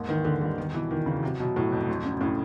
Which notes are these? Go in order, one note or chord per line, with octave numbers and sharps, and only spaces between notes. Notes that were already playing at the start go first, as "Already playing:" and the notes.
Already playing: D#2 G#2
D#3 E3
D#2 D3
D3 G3
E2 D#3
B2 E3
E2 D#3
E2 C#3
C3 F#3
B2 F#3
A2 F#3
F2
D2
C#3
A2 C#3